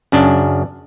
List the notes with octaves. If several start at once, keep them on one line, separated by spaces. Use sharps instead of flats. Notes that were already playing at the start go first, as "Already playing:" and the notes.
F#2 C#3 D4